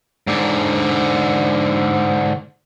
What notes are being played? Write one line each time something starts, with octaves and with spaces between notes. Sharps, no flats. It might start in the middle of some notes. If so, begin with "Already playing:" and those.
G#2 D3